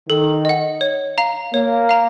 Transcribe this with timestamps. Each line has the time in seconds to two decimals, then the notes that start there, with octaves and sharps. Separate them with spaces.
0.09 D#3 A4
0.45 D#5 F#5
0.81 C#5
1.18 F5 A#5
1.54 A#3 C#5
1.89 F5 A#5